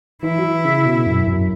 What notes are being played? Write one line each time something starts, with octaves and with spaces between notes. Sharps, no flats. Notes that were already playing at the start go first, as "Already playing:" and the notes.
E3 E4
F#3
E3
C#3
B2
F#2
F#2